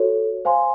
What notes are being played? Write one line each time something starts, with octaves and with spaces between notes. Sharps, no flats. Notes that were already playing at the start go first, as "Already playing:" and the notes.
Already playing: F#4 A4 C#5
C5 F5 G#5 C6